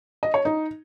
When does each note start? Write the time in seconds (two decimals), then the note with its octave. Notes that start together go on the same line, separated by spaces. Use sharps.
0.23 D#5
0.34 C#5
0.45 D#4